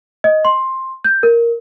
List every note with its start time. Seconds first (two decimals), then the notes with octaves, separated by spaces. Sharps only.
0.24 D#5
0.45 C6
1.04 G6
1.23 A#4